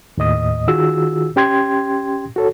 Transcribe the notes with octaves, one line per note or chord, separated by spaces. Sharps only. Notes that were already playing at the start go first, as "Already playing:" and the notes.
D#2 A2 D#5 D#6
D#3 F4 F#4 G#4 E6
C#4 G4 G5 C6 G#6
F#4 A4 C#5